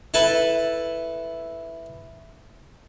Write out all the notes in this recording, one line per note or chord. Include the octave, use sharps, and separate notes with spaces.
E4 A4 B4